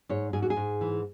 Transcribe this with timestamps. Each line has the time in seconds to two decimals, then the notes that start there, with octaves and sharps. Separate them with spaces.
0.09 G#2 C#5
0.33 G#2 G#4
0.42 F#4
0.50 G#4
0.56 G#2
0.81 E3